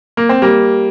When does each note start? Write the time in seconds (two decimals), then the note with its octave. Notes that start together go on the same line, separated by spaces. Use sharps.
0.17 A#3
0.29 C4
0.42 G3 A#3